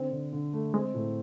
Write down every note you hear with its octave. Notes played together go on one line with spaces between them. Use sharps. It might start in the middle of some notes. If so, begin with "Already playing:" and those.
Already playing: D3 C4
D3
D3
A3
G#3 C4
A2